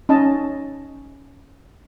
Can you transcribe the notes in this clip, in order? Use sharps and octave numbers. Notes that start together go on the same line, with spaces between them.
C#4 D#4 D#5 A5